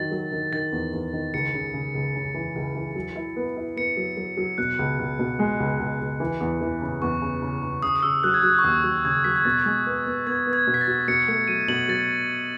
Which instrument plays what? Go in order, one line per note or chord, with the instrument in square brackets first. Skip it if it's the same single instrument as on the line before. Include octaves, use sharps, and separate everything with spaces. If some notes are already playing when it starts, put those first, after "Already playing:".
Already playing: [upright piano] D#3 F#3 [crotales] A6
[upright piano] F#3
D#3
[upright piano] D#3 [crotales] A6
[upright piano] E2
E2
D#3
[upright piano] C#2 [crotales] C#7
[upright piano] C#3
C#3
C#2
C#3
E3
C#2
E3
F#3
E4
B3
E4
[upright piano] B3 [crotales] C#7
[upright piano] F#3
F#3
F#3
[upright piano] B2 [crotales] F#6
[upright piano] C#2
C#2
B2
G#3
C#2
C#2
C#2
E3
E2
E3
C#3
[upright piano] E2 [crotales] C#6
[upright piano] C#3
C#3
C#3
[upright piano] C#3 [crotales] D#6
[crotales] D#6
[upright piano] C#3 [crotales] E6
[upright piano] F#3 [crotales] F#6
[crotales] G#6
[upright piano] F#3 [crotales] F#6
[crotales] C#6
[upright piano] D#2 [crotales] D#6
[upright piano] F#3 [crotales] C#6
[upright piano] C#3 [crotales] G#6
[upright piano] F#3 [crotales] B6
[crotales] G#6
[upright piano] B2 [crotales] A6
[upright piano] G#3
B3
B3
[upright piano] B3 [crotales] G#6
[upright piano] B3
[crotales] G#6
[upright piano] B2
[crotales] B6
A6
[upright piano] F#4
[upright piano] B2 [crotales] C#7
[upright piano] A3 [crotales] C#7
[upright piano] F#3 [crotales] D#7
[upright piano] B2 [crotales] F#7
[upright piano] F#3 [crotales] A6